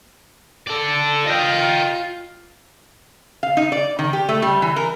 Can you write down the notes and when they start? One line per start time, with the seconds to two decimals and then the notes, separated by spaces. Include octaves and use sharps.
0.67 A4 D5
1.27 F4 D#5 G5
3.43 F5
3.57 D#4
3.72 D5
3.99 D#3
4.13 G4
4.29 A3
4.42 G3
4.62 E3
4.76 A#4